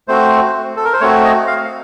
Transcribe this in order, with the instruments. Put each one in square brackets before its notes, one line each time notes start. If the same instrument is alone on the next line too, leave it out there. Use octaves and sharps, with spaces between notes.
[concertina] A3 C4 F#4 C5
A4
A#4
C5
A3 C4 F#4 C#5
D#5
F5